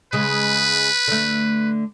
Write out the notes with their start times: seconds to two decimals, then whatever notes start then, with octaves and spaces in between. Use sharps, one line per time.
0.13 C#3 G#3 B4
1.08 D3 A3